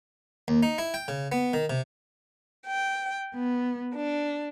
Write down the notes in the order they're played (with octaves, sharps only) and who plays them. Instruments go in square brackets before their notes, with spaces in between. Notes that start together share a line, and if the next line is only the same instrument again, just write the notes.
[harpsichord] D#2
D#4
E4
G5
C#3
B3
D#3
C3
[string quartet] G5
B3
D4